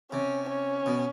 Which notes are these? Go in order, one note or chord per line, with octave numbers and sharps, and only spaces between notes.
C3 C#4
C#4
B2